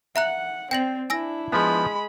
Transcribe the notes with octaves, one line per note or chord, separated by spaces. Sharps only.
E5 F#5 A#5 F#6
C4 C5 D5 G5 A#6 F#7
D4 E4 G#5 E6 A#6
F3 G#3 B3 B5